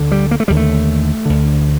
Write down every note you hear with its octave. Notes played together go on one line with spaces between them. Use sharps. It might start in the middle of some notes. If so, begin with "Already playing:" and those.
Already playing: D2 D3
G3
A#3
A3
D#2 D3 G3
A3
D2 D3